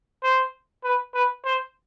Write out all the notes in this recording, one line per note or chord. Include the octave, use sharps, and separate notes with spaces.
C5
B4
B4
C5